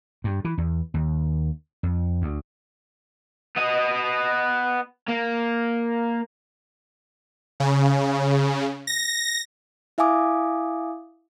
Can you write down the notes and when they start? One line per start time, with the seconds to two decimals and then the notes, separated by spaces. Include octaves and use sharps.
0.24 G2
0.45 E3
0.58 E2
0.94 D#2
1.83 F2
2.22 D2
3.56 B3 D#5
5.09 A#3
7.60 C#3
8.87 A#6
9.98 E4 E5 F5 G#5 D6 D#6